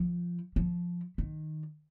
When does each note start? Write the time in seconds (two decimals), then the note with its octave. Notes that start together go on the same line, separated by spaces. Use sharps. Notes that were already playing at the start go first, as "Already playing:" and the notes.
Already playing: F3
0.56 F3
1.18 D#3